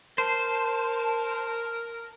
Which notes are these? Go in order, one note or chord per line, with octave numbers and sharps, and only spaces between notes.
A#4 C5 A5